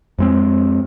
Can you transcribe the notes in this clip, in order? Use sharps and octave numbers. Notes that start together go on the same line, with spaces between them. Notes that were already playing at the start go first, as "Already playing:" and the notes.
F2 G#3 C4